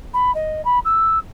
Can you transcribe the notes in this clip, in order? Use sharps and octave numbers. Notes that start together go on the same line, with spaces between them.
B5
D#5
B5
E6